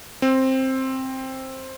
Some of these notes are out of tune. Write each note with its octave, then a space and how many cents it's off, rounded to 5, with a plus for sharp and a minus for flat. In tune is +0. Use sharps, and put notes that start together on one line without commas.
C4 +10